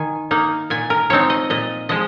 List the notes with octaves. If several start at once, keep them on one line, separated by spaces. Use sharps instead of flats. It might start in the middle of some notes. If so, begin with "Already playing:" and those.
Already playing: D#3 G#5
A#3 D#4
A#2 G#5
A#4
F3 C4 D#4 C#5
D#5
A#2 D#5
F3 G#3 D#5